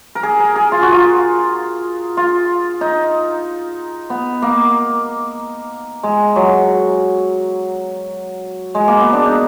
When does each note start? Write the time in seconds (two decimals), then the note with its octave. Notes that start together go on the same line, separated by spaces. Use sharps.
0.15 A#4
0.23 G#4
0.39 A#4
0.56 G#4
0.72 F4
0.82 F#4
0.92 F4
2.17 F4
2.81 D#4
4.10 B3
4.42 A#3
6.03 G#3
6.36 F#3
8.75 G#3
8.88 A#3
9.01 B3
9.13 D4
9.26 D#4